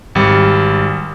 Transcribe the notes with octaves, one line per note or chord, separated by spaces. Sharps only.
G#1 G3